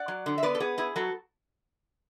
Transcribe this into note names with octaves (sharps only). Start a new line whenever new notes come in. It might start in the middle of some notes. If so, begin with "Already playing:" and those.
Already playing: D5 F#5
F#3
D3
E5
B3 B4 D5
A4
B3 G#4
E4 G#4
F#3 F#4 A4